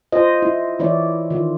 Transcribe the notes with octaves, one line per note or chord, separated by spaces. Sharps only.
F4 C5 D#5
E4
E3 E4 C#5 D5
D#3 F4